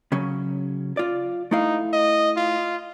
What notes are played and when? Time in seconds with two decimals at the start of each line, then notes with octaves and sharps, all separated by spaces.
0.12 C#3 F#3 C#4
0.97 F4 D5
1.51 A3 D#4 E4 F5
1.93 D#5
2.37 F4